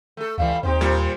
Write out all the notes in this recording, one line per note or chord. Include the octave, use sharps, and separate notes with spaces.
A3 A4
C#2 E3 G3 A3 F5
D#2 C4 D#4 G4 C5
A#2 G3